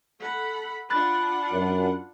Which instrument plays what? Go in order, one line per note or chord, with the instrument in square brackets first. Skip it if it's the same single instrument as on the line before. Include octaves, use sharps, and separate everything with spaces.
[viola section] A4 F#5 B5
[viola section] D4 F4 F#5 [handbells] B5 F#6 A6
[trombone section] F#2